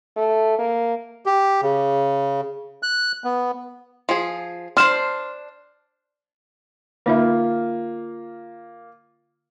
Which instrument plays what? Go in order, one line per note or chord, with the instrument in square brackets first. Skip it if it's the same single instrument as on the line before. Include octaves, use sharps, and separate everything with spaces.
[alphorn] A3
A#3
[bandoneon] G4
C#3
F#6
B3
[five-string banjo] F3 G#4
[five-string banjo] D4 C5 [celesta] C6 F6 E7
[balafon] D3 D#4 E5 [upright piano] A#3 F4